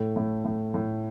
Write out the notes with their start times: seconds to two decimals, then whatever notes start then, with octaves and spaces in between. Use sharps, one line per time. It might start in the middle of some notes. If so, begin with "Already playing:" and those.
Already playing: A2 A3
0.16 A2
0.45 A2
0.74 A2